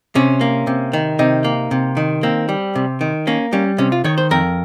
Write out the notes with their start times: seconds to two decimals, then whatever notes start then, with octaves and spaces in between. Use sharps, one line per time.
0.15 C3 C#4
0.41 A#3
0.67 C3
0.93 D#3
1.19 C3 D#4
1.44 A#3
1.71 C3
1.97 D#3
2.23 A#3 C4
2.49 G3
2.75 C3
3.01 D#3
3.27 A#3 C#4
3.53 G3 C#4
3.78 C3 C#4
3.92 F4
4.04 D#3 C#5
4.18 C5
4.31 F2 A#4